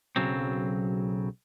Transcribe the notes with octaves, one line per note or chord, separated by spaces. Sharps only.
B1 C#3 F#3 C4